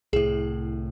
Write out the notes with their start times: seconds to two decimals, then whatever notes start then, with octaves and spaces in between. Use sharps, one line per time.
0.13 C2 A2 G#4